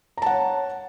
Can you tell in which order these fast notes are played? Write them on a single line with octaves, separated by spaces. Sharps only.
A#5 A5 F#5 C#5